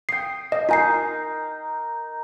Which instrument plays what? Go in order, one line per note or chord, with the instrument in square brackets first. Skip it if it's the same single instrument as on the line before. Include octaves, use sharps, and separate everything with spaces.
[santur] G5 D#6 [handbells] C7
[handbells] D#5
[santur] D#4 A#4 [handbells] F4 G#5 C7